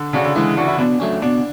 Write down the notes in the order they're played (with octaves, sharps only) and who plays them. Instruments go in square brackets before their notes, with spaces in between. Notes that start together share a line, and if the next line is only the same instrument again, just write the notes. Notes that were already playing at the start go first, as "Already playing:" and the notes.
Already playing: [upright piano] D3
[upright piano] C#3 [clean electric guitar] D4 F#4
[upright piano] D3
[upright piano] E3 [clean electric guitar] G#3
[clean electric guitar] D4 F#4
[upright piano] E4
[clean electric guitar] B2 [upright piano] D4
[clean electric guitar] F#3 A3 C#4
[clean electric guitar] B2 [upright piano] D4